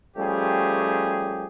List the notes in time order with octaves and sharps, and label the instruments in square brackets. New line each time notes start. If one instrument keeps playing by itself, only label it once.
[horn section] F3 G3 A3 C#4 G4 G#4